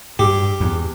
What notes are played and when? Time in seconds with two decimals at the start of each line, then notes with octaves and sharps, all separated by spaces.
0.19 G2 G4
0.60 E2